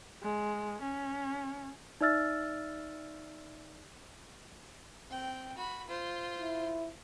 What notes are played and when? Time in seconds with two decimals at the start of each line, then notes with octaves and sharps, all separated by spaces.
0.23 G#3
0.82 C#4
2.01 D#4 D5 E5 E6 F6 A6
5.10 C4 G5
5.57 F#4 B5
5.88 F4 C5
6.40 E4